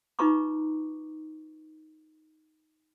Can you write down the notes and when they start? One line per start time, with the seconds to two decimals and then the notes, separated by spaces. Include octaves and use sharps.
0.19 D#4 F4 B4 A#5 C#6 D6